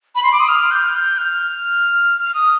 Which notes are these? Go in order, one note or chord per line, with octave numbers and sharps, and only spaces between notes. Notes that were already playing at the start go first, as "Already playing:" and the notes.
B5
C6
D6
D#6
F6
G6
F6
G6
F6
F6
D#6